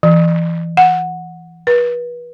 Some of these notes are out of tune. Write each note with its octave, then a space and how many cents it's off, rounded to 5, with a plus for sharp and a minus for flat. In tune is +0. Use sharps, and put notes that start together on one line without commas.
E3 +20
F#5 -10
B4 -30